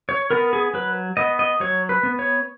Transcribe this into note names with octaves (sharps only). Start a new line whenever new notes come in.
C#5
B3 A#4
G#4
F#3 B4
B3 D#5
D#5
F#3 C#5
B4
B3
C#5